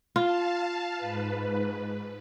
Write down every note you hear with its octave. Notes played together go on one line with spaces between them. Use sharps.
F4 F5 A5
G#2 B4